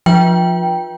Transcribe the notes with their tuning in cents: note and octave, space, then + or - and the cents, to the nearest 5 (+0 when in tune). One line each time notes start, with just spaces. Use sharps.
F3 +0 F4 +30 G5 +0